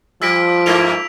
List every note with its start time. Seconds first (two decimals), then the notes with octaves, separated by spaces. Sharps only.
0.22 F3 G3 E6 B6 D7
0.66 G2 A3 A#3 F7